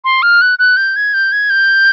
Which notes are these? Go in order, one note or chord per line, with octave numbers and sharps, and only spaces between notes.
C6
F6
F#6
F#6
G6
G#6
G6
G#6
G6